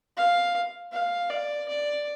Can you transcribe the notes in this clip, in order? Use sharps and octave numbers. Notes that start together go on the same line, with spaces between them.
F5
F5
D5
D5